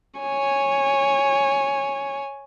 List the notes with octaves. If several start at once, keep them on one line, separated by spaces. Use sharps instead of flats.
C#5 G#5